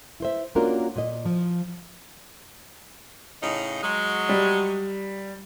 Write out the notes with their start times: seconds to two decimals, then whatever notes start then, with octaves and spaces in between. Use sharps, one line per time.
0.20 E4 C5 E5
0.55 A#3 C#4 D4 F4 F#4 A#4
0.96 A#2 D#5
1.25 F3
3.43 A2 C#3 D#4
3.83 F#3 G#3
4.29 G3